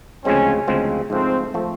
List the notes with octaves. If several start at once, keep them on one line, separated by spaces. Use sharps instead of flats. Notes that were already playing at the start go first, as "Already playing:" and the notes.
D2 C#3 F3 G#3 C4 C#4
D2 C#3 F3 G#3 C4
G#2 F3 A3 C4
F3 A3